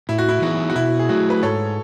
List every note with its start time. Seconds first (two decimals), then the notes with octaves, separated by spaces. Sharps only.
0.09 A2 E4
0.18 F#4
0.29 E4
0.42 E3 B3 D#4 F#4 G#4
0.70 F#4
0.75 B2 E4
0.99 G#4
1.09 F#3 A3 F#4
1.30 B4
1.43 G#2 A4 C#5